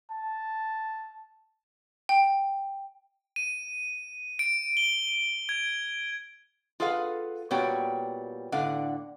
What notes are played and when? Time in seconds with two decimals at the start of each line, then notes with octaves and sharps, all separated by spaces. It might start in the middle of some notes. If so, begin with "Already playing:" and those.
0.11 A5
2.09 G5
3.36 D#7
4.39 D7
4.77 G7
5.49 G#6
6.80 F4 G#4 A4 B4 F5 F#5
7.51 A#2 G3 B3 F#4 C#5 G5
8.52 A2 D3 F5 F#5